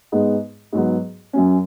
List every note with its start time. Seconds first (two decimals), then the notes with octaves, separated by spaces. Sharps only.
0.12 G#2 G#3 B3 D#4
0.73 G#2 F#3 B3
1.33 F#2 F#3 C#4